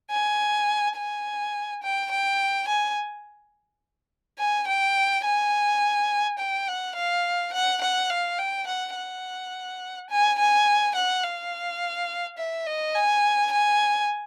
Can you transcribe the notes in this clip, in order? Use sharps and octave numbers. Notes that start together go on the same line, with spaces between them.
G#5
G#5
G5
G5
G#5
G#5
G5
G#5
G5
F#5
F5
F#5
F#5
F5
G5
F#5
F#5
G#5
G#5
F#5
F5
E5
D#5
G#5
G#5